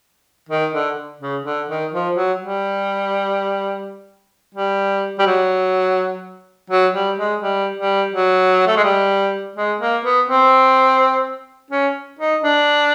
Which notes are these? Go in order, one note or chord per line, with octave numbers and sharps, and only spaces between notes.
D#3
D3
C#3
D3
D#3
F3
F#3
G3
G3
G3
F#3
F#3
G3
G#3
G3
G3
F#3
A3
G#3
G3
G#3
A#3
B3
C4
C#4
D#4
D4